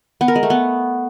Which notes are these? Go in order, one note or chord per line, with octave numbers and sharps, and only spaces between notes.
B3
A#4
G#3
A3
B3